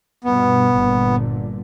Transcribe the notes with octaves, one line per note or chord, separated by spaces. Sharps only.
G2 B2 B3
G1 A#2 D3